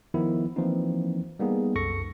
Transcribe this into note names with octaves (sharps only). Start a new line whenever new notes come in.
D#3 F3 B3 E4
E3 F3 A#3 C4 D#4
G3 A#3 B3 D#4 G#4
C2 F#2 A4 C#6 A#6 C#7